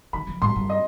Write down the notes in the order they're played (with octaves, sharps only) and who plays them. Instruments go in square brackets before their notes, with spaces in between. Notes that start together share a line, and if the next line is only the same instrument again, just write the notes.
[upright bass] D#3 [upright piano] B5
[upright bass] F3
[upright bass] G#2 [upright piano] C6
[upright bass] G2
[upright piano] D#5